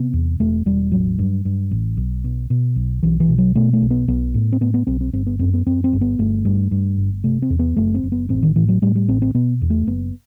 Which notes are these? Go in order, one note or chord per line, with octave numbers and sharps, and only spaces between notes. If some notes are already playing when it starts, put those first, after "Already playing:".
Already playing: C3 B3
E2
E1 A3
E1 G3
A1 F#3
G2
G2
A1
B1
B2
B2
B1
B1 E3
E3
B2
F#3
B2 A3
A3
B1
B3
B1 B3
A2
C4
A2 B3
B3
B1 C4
C4
G1 C4
B3
F#2 C4
B3
F#2 C4
C4
G1
B3
G1 A3
G2
G2
G1
C3 A3
C4
E2
B3
F#1 A3
C4
F#1
B3
A1 C4
D#3
A2 E3
F#3
A2 G3
G3
A1 C4
C4
B2 B3
E2
A3
F#1 B3